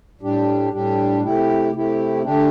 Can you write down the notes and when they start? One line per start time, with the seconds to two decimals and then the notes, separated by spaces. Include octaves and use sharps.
0.21 A2 G3 D4 G4
0.72 A2 G3 D4 G4
1.22 C3 A3 E4 G4
1.73 C3 A3 E4 G4
2.23 D3 A3 D4 G4